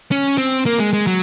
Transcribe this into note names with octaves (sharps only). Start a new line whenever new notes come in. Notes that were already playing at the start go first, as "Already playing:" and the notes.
C#4
C4
A#3
G#3
G#3
F#3